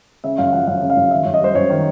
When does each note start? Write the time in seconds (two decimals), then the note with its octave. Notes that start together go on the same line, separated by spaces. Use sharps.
0.24 C#3 E5
0.38 F#2 F5
0.53 F3 F#5
0.67 F#2 F5
0.82 C#3
0.90 F5
0.97 F#2
1.11 D#3 E5
1.25 F#2
1.34 D#5
1.40 G3 C5
1.55 F#2 C#5
1.70 D#3